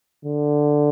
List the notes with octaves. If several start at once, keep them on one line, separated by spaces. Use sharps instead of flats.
D3